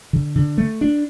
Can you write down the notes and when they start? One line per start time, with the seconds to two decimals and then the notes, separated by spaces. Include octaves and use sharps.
0.13 D3
0.35 D3
0.58 A3
0.81 D4